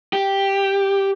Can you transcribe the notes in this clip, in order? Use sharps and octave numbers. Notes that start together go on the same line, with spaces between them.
G4